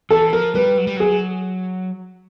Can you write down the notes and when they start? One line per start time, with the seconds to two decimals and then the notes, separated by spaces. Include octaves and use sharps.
0.10 E3 A4
0.33 F3 A#4
0.55 G3 B4
0.78 F#3
0.87 G3
0.97 F#3 G#4